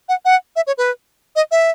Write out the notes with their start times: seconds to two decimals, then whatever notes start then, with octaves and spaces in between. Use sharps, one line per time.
0.09 F#5
0.25 F#5
0.56 E5
0.67 C#5
0.78 B4
1.36 D#5
1.51 E5